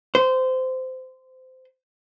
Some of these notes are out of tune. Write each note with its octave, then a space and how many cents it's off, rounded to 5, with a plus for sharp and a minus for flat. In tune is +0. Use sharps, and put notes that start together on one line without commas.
C5 -20